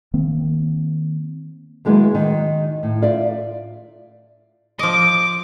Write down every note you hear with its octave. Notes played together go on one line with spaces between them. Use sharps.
D#3 A#3 C4
D#3 F#3 G#3 A#3 B3 E4
D#3
A2
F4 D5 E5
F3 D#5 D6